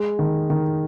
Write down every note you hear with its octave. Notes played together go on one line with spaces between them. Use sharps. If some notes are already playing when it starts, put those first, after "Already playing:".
Already playing: G#3
D#3
D#3